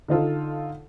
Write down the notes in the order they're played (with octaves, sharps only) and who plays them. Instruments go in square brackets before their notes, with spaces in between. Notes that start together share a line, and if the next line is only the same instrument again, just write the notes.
[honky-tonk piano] D3 D#4 F4 A4